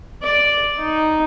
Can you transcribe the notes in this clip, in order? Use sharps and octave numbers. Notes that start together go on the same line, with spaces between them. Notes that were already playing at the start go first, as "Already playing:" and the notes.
D5
D#4